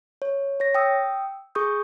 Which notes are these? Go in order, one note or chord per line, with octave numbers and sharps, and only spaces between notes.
C#5
C#5 A#6
G5 D#6 E6
G#4 C#6 D#6 G6